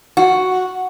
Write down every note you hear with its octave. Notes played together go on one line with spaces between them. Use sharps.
F#4